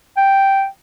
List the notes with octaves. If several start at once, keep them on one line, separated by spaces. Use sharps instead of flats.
G5